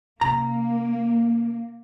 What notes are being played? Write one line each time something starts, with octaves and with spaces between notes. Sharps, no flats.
C3 A#3 C#4 A#5